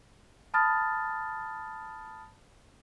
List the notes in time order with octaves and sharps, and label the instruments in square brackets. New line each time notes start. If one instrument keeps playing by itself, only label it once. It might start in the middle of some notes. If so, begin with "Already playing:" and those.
[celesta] A5 B5 D#6 F6 A6